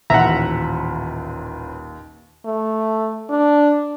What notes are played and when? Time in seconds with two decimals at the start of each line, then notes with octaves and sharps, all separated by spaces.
0.10 D#1 A1 D#2 E5 F#5 A#5
2.45 A3
3.30 D4